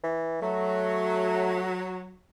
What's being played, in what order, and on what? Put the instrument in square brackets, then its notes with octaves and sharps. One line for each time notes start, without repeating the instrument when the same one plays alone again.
[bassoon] E3
[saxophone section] F#3 [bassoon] A3